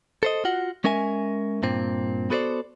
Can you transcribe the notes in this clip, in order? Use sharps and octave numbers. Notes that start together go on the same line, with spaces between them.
A4 C5 D#5
F4 F#4 F#5
G#3 C#4 A#4 E5 G#5
G2 A#2 C4
B3 F#4 A4 B4 C5 D5